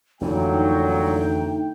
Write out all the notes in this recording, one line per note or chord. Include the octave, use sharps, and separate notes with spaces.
F2 A#2 D3 E3 F#3 A3 D#4 G5